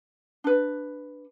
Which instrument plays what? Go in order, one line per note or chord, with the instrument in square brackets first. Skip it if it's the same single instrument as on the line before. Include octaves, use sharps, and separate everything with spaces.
[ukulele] D4 B4